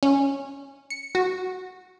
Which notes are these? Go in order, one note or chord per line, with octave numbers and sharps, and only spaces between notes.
C#4
C#7
F#4